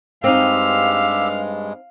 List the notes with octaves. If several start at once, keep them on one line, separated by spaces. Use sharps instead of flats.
G2 G#3 C4 D#4 G4 F5 E6